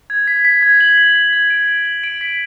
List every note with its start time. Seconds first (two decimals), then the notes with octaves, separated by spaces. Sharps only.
0.10 G#6
0.27 B6
0.45 B6
0.62 G#6
0.81 F#7
0.98 B6
1.16 B6
1.33 G#6
1.50 D7
1.68 F#7
1.85 F#7
2.03 D7
2.21 B6